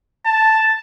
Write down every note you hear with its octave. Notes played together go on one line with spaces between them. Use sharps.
A5